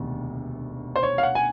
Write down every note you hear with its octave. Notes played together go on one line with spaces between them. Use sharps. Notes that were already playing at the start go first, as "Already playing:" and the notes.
Already playing: E1 D2 C3 D#3
C5
C#5
F5
F#5
G#5